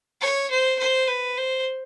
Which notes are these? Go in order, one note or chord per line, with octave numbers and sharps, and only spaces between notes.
C#5
C5
C5
B4
C5